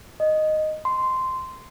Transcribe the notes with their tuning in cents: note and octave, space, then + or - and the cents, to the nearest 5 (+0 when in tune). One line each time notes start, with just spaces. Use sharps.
D#5 -5
C6 -10